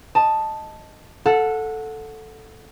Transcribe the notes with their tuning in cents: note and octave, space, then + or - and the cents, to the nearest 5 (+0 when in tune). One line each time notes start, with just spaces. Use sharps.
D#5 +0 A5 +0
A4 +0 F#5 -20 E6 +40